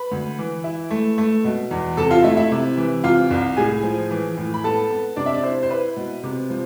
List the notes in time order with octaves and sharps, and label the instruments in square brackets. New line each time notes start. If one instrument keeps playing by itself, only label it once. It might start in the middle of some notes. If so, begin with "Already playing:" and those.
Already playing: [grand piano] B4 B5
D2
E3
E4
A3
A3
B2
E2
C3 A4 A5
F4 F5
A3 E4 E5
E4 E5
C3
E3
C3 F4 F5
C2
A2 G#4 G#5
F3
E3
A2
B5
B3 A4 A5
B3
C3 D4 D5
E5
D5
E4 C5
C5
E4 B4
B2
C3
F3